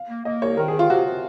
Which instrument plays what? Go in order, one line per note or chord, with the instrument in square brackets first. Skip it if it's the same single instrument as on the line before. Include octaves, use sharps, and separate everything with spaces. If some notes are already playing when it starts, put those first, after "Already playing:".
Already playing: [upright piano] F5
[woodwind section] A#3
[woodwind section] A#3 [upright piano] D#5
[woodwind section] C2 [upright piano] C#5
[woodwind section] D#3 [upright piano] A#4
[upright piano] G#4
[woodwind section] C3
[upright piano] F4
[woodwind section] C3 [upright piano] F#4
[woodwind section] C3